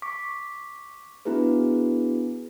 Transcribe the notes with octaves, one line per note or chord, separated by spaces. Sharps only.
C#6 D6 B6
B3 D4 E4 F#4 G#4 B4